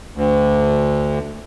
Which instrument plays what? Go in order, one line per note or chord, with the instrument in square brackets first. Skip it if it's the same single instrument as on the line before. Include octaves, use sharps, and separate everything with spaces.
[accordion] D2